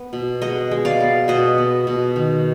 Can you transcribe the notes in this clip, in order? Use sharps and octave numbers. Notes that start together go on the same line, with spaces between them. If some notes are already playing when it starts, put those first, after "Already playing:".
Already playing: B3
B2
G#3 D#5 F#5
G#3
D5 F5
B3
B2 D#5 F#5
B3
B2
D#3